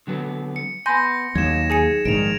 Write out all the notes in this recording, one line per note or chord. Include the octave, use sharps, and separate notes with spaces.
D3 F#3 B3
C#7
B3 G#5 B5 C6 G6 A#6
D#2 F#3 D#4 G#6 E7
G#4 G#5 C#7
A#1 G#2 D#3 D7 F7